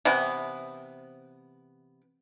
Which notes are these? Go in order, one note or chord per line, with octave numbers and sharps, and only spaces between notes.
C3 E3 B3